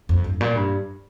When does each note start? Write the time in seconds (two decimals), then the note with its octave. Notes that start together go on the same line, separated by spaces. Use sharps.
0.09 F2
0.24 G2
0.41 A#2
0.56 G2